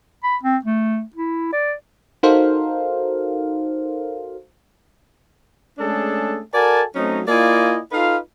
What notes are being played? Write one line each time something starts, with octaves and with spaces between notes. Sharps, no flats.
B5
C4
A3
E4
D5
D#4 F#4 A4 A#4 C5 F5
G#3 A3 C#4 D4 G#4 A4
F#4 A4 A#4 D5 G#5 A5
F#3 A3 C4 C#4 D#4
A#3 E4 F4 D5 D#5 G#5
D#4 F4 A4 B4 F5